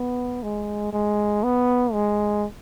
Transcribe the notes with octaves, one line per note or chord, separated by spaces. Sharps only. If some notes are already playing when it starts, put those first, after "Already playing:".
Already playing: B3
G#3
G#3
B3
G#3